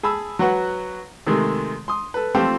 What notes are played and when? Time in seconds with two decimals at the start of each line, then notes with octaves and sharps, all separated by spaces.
0.03 G#4 A5 B5 E6
0.39 F#3 F#4 B4 F#5
1.27 C3 D#3 G#3 A3
1.88 C6 D#6
2.14 A4 B4
2.35 F3 A3 C4 F4 G4 A4